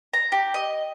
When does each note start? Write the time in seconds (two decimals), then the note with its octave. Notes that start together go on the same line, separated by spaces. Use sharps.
0.13 A#5
0.32 G4
0.54 D#5